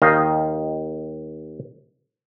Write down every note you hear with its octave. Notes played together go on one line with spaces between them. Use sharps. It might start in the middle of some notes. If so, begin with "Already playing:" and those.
D#2 D#3 D#5 F5